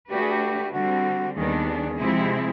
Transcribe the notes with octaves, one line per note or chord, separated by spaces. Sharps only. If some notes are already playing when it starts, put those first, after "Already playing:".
A3 D4 F#4 G4 B4
G#4
G4
D3 G3 C4 F#4
D#2 D#3 G3 B3 D4 G#4
C3 F3 G#3 C4 E4